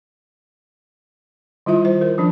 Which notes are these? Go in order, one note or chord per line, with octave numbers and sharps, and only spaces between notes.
D#3 G3 E4 F4 E5
C5
A#4
F3 C#4 D4